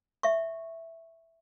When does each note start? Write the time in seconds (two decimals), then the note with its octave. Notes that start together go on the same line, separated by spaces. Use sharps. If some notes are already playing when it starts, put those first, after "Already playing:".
0.23 E5 C#6